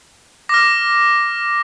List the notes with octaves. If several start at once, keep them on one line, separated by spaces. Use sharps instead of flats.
D6 F6 A#6